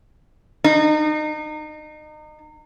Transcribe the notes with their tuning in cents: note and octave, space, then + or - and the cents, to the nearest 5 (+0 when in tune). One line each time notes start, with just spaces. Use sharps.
D#4 -30